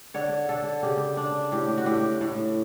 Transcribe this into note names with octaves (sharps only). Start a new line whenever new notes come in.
D3 C#5
D3 A4
C#3 G4
D4
A2 G4
F#4
A2 G4
A2